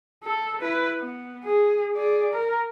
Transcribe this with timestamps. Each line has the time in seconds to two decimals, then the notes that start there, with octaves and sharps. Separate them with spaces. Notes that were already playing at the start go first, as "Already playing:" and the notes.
0.24 A4
0.62 E4 B4
0.99 B3
1.45 G#4
1.95 G#4 D5
2.33 A#4